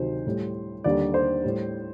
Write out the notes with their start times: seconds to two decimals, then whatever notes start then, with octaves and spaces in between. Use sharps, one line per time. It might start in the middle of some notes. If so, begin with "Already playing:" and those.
Already playing: D2 C3 D#3 F#3 C5
0.26 A2 G3
0.84 D#2 D3 G3 D5
1.14 C5
1.44 A2 G3